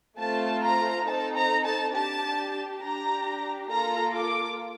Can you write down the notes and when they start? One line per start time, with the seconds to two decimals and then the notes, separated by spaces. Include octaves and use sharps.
0.18 A3 C4 F4 A4 A5
0.63 A#5
1.06 C4 D#4 A4 A5
1.36 A#5
1.65 A5
1.94 D4 G4 A5
2.82 D4 G4 A#5
3.70 A#3 F4 A4 A#5
4.14 D6